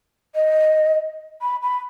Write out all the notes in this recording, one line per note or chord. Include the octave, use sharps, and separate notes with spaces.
D#5
B5
B5